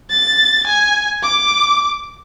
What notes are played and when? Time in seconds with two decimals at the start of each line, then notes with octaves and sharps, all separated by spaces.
0.10 A6
0.67 G#5
1.23 D6